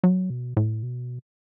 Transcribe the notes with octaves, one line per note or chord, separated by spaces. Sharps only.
F#3
B2
A2
B2